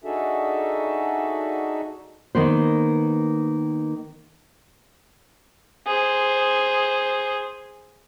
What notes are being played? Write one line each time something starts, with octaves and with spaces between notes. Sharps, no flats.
D4 D#4 F#4 G#4 A4 E5
D#3 A#3 B3 C5
G#4 C5